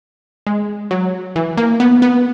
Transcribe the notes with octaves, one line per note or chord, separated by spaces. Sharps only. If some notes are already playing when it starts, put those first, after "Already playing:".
G#3
F#3
E3
A#3
B3
B3